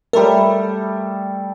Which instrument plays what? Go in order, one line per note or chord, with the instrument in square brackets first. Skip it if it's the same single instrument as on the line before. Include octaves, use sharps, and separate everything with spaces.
[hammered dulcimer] G3 A3 A4 [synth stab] A#4